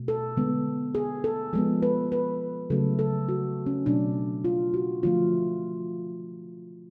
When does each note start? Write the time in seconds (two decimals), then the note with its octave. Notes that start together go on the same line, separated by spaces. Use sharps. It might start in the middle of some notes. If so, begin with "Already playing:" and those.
Already playing: B2 A3
0.08 A4
0.37 D3 G#3 B3
0.95 G#4
1.24 A4
1.53 F3 G#3 B3 A4
1.82 B4
2.12 B4
2.70 C#3 F#3 A3 A4
2.99 A4
3.28 F#4
3.66 C#4
3.86 B2 F#3 A3 D4
4.45 F4
4.74 F#4
5.03 D3 F3 A3 F4